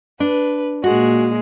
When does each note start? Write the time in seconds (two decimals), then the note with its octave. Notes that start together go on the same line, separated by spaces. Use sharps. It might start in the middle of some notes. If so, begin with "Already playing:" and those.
0.20 D4 B4
0.84 A#2 G#3 F#4